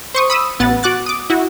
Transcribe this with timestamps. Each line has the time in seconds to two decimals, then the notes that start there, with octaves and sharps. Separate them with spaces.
0.15 C5 C#6 D#6
0.30 B5 D#6 E6
0.59 A1 B3 F#5 A6
0.83 F#4 D6 F#6 A6
1.06 D6 D#6
1.30 E4 F#4